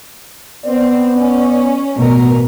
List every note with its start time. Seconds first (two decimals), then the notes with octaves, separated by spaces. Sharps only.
0.66 B3 C4 D5
1.18 C#4
1.97 A1 B2 A#4